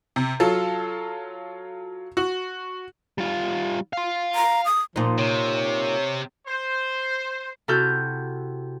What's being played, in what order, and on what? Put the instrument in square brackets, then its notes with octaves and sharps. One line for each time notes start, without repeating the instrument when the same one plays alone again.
[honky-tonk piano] C3
F#3 F4 A4
F#4
[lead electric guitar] G3 F4
F5 C6
[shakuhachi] A#5
D#6
[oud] A#2 D#4 [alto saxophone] F3
[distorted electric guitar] C3 [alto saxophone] C#5
[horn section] C5
[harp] C3 E4 F#4 A4 F6 G6